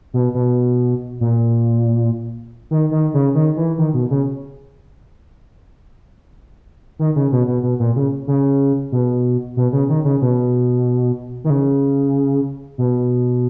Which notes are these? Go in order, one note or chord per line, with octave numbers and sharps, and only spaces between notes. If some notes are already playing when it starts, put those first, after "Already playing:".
B2
B2
A#2
D#3
D#3
C#3
D#3
E3
D#3
B2
C#3
D#3
C#3
B2
B2
B2
A#2
C#3
C#3
B2
B2
C#3
D#3
C#3
B2
D#3
C#3
B2